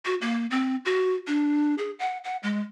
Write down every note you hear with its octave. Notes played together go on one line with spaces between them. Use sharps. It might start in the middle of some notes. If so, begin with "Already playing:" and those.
F#4
A#3
C4
F#4
D4
G#4
F#5
F#5
G#3